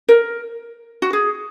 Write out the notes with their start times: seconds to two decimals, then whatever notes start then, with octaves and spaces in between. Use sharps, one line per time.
0.09 A#4
1.02 F#4
1.13 G#4